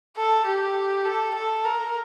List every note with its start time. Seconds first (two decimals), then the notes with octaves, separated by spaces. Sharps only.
0.17 A4
0.45 G4
1.05 A4
1.34 A4
1.65 A#4